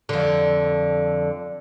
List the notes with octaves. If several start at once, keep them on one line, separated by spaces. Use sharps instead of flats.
F2 D3